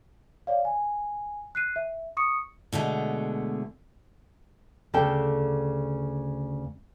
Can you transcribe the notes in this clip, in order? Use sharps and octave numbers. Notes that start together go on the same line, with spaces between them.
C#5 D5 F5
G#5
F#6 C7 D#7
E5
C#6 D#6 C#7
B2 D3 G#3 A3
D2 C#3 A4 D5 G5 A5